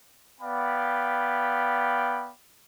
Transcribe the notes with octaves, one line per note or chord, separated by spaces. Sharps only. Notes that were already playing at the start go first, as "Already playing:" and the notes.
B3 D5 F5 G5 B5